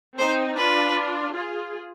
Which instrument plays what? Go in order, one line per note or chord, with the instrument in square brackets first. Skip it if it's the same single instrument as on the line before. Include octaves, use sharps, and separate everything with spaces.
[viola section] C4 D#4 [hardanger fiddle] C5
[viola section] D4 F4 [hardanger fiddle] B4
[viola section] F4 G#4